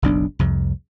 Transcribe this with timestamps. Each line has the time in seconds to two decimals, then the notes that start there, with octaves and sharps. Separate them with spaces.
0.02 F#1 B1 D4
0.39 C2 F2